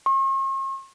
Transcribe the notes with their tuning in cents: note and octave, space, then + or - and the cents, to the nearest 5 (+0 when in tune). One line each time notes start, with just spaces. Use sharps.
C#6 -45